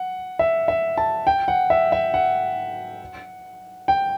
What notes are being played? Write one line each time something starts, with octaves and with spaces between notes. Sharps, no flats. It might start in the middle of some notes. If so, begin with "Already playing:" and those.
Already playing: F#5
E5
E5
A5
G5
F#5
E5
E5
F#5
G5